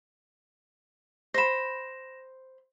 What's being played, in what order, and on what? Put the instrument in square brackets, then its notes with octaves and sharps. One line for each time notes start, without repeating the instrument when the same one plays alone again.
[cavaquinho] C5 B5 [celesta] A#6 E7